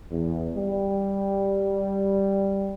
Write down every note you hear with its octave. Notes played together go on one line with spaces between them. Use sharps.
E2
G3